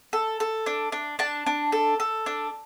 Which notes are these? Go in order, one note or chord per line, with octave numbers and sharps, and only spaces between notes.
A4
A4
D4
D4
D4 A5
D4
A4
A4
D4